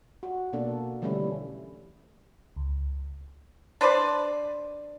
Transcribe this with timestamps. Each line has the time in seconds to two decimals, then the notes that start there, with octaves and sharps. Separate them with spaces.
0.23 F#4
0.53 B2 A#3 D4 A4
1.02 D3 E3 G3 A3 C#4 E4
2.56 C#2
3.81 D4 B4 C5 D5